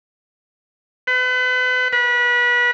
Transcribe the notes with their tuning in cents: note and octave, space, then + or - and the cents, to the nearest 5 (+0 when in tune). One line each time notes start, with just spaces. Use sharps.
B4 +35
B4 -30